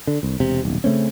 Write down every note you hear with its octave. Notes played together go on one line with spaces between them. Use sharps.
D3
C2
E1 C3
D#1 B1
C#3 A3 C4 C#4